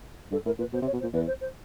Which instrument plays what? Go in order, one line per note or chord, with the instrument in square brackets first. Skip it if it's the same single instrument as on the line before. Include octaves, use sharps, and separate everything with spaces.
[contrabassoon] G2 [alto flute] A4
[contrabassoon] A2 [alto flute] A#4
[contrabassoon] A#2 [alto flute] B4
[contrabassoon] B2 [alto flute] C5
[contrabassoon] C3
[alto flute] C#5
[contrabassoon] B2
[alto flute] C5
[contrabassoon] A#2
[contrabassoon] E2 [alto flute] B4
[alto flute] C5
C5